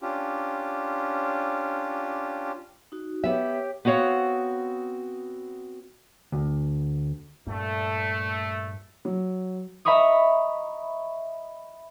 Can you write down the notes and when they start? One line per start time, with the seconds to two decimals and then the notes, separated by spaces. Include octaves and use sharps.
0.01 C#4 D4 F4 G4
2.92 D#4 F#4
3.24 B3 G4 C#5 E5
3.85 B3 C4 F#4 C#5 F5 F#5
6.32 D2
7.47 G2 A#2 A3
9.05 F#3
9.85 D#5 E5 A#5 B5 C#6 D#6